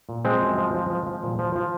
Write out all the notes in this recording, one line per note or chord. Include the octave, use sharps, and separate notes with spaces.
A#2
F3 G#3 C4
F#2
F3
F3
F3
F3
A#2
F3
F3